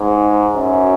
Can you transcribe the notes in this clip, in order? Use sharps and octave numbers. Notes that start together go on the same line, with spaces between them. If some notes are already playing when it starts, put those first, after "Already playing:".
Already playing: G#2
F#2